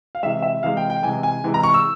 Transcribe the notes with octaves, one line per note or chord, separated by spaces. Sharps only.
F5
C3 E3 G#3 E5
E5
C3 E3 G#3 F5
G5
G5
C3 E3 G#3 G#5
G#5
C3 E3 G#3
A#5
C#6
E6